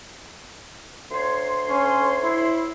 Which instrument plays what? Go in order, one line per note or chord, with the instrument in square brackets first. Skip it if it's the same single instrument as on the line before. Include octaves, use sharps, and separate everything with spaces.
[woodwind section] D2 C#5 C6
[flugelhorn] C#4
E4